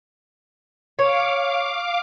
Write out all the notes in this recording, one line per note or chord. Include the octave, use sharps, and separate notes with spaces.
C#5 F5 D6